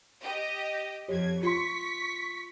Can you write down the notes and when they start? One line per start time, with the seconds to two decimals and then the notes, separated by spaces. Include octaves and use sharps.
0.22 G4 D#5
1.08 F2 G4 C#5 G#6
1.43 F4 C6 C#6 B6